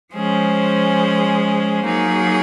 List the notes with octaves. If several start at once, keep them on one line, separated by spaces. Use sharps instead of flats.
F3 G#3 C#4 G#4 C5
F#3 A#3 D#4 G#4